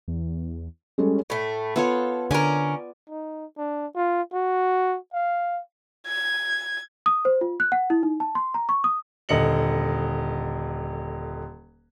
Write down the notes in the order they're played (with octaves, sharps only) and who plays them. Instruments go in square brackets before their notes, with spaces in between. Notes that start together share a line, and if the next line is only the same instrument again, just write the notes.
[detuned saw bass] E2
[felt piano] G3 G#3 A4 [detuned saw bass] C#4
[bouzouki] A2 A3
[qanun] B3 F4 C#5 [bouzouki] A4
[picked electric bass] D3 [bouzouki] C#4 A#4 [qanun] D5 G#5
[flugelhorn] D#4
D4
F4
F#4
F5
[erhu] G#6
[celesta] D#6
C5
F4
F#6
F#5
E4
D#4
A5
C6
A#5
C#6
D#6
[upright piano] D#1 D3 D#5 C#7 F#7